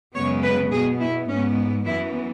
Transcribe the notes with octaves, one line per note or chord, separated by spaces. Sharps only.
F#2 C#3 G#3 B3 C#5
B4
B2 B3 G#4
E4
G#2 G#3 B3 C#4
F#2 E3 B3 E4